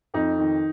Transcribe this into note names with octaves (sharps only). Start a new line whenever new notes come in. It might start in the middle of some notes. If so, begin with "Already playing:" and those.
F2 D#4
D#3